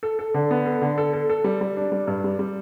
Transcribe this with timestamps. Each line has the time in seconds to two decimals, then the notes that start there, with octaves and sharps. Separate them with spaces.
0.03 A4
0.19 A4
0.34 D3
0.51 B3
0.66 A4
0.81 D3
0.98 A4
1.13 A4
1.29 A4
1.44 G3
1.61 G3
1.76 D4
1.92 G3
2.07 G2
2.24 G3
2.39 G3